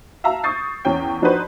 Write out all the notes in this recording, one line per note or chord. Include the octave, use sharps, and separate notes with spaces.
E5 F5 A5 A#5 E6
C#6 D#6 G6 A6 C7
E2 C#4 G5
F3 D4 D#4 F#4 B4 C5